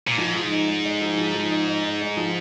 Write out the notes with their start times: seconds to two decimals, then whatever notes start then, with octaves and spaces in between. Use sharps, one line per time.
0.07 A#2
0.18 G#2 F3
0.35 F3
0.51 D#4
0.67 G#3
0.85 G#3
1.01 F3
1.18 F3
1.34 F3
1.50 D#4
1.67 D#4
1.85 D#4
2.01 G#3
2.17 F3